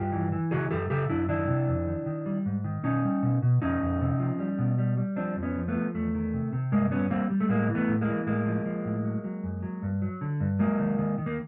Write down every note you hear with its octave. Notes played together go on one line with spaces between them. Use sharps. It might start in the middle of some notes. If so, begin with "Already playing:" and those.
Already playing: G2 F4 G4
E3
E3
C#3 F#4 G#4
F#2 G4 A4
C#3 G4 A4
F#2 D4 E4
D#3 D4 E4
C3
F2
D#3
D#3
G3
G#2
D#3
B2 C#4 D#4
G3
B2
B2
F2 C#4 D#4
F2
C3
F3
G3
B2
G3
G3
F3 C4 D4
F2
B3 C#4
F3
A3 B3
F3
E2 A3
D#3
C3
C3
G2 G#3 A#3
G3 B3 C#4
G3 A#3 C4
G3
A3
A2 G#3 A#3
E3
A3 B3
A2
G#3 A#3
E3
A2 G#3 A#3
F3
F3
A2
F#3
F#3
F#2
F#3
G2
F#3
D3
G2
F#3 G#3 A#3
D#3
D#3
D#3
A#3